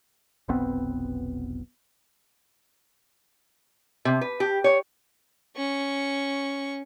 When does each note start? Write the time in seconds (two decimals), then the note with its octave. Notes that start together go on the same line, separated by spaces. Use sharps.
0.48 F1 B1 B3 C4
4.05 C3
4.21 B4
4.40 G4
4.64 C#5
5.56 C#4 C#6